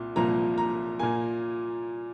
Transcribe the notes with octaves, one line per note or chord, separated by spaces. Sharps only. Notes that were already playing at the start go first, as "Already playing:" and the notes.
Already playing: C2 A#2
C2 A#2 F3 A#3 A#5
A#5
A#2 A#3 G#5